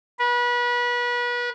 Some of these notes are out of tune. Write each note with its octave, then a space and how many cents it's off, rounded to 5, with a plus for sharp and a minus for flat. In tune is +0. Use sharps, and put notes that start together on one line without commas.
B4 -30